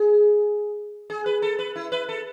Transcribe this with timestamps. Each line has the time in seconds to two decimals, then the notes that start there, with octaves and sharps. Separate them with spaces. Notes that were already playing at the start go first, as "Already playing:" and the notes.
Already playing: G#4
1.10 G#4
1.26 B4
1.42 A4
1.59 B4
1.76 E4
1.92 B4
2.09 A4